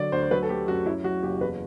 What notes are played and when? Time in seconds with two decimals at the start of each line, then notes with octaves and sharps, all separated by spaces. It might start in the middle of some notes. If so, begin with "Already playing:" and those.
Already playing: D3 F#3 D5
0.12 D2 C5
0.23 C5
0.31 F#3 B4
0.43 A4
0.49 A3 G4
0.68 F#2 F#4
0.86 F#2 E4
1.04 F#3 F#4
1.23 F#1 G4
1.41 E2 B4